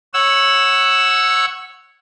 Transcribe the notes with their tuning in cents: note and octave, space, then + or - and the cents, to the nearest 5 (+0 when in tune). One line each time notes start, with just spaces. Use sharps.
C#5 -10 F#5 +0 E6 +0